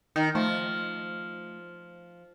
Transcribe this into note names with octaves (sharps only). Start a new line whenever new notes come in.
D#3 D#4
F3 A3